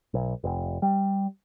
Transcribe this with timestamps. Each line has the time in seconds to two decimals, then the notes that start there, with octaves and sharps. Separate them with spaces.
0.14 B1
0.44 F1
0.82 G3